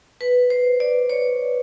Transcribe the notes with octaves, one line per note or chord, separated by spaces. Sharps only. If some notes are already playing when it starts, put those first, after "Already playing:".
B4
C5
D5
C#5